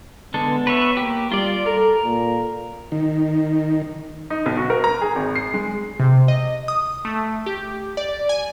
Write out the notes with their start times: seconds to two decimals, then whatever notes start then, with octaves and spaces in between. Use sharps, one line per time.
0.34 D3 G#3 B3 A4
0.67 B4 C#5 E5
0.97 A#3 G4
1.32 G3 F4 D5
1.66 A4 A#4
2.05 A#2
2.92 D#3
4.30 D#4
4.46 B1
4.57 F#4
4.70 A#4
4.84 A#5
5.01 G#4
5.16 G#1
5.36 C7
5.54 G#3
6.00 C3
6.28 D#5
6.68 D#6
7.05 A3
7.46 G4
7.97 D5
8.29 G#5